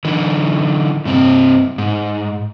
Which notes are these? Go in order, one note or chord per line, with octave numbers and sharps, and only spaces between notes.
D3 E3
G2 C3 C4
G#2